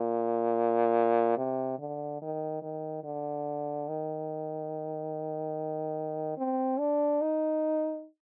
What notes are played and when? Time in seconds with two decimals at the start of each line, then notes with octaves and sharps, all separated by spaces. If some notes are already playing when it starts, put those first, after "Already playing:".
Already playing: A#2
1.37 C3
1.79 D3
2.22 D#3
2.62 D#3
3.04 D3
3.88 D#3
6.38 C4
6.79 D4
7.22 D#4